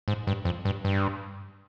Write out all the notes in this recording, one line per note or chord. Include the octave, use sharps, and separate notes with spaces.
G#2
G2
F2
G2
G2